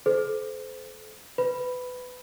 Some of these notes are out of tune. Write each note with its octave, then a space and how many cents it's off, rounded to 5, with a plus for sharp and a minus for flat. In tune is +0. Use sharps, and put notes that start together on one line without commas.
A4 -40 C5 -25
B4 +20 B5 +0